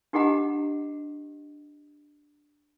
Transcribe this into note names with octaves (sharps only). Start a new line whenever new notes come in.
D4 G4 G#4 D#5 F#5 A#5